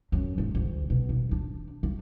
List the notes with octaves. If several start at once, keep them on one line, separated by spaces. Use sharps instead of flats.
F#2
G#2
D2
B2
D#3
D4
D#3